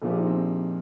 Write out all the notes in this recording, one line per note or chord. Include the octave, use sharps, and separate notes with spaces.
A#1 A#2 F3 G#4
G4
D#4
C4